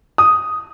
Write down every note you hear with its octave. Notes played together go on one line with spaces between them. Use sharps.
D#6